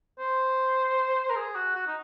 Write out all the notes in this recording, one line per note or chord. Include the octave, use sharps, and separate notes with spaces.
C5
A#4
G#4
F#4
F#4
D#4